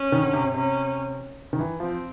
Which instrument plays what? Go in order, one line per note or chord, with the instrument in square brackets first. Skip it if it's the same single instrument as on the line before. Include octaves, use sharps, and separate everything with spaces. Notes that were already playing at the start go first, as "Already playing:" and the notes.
Already playing: [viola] C#4
[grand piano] D#3
D3
C3
C3
[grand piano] C3 [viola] C#4
[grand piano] D#3
E3
[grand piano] F3 [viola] C4